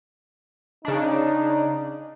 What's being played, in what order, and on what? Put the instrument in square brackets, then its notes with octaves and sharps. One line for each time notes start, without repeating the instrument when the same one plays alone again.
[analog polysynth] C#3 D4 [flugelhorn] D#4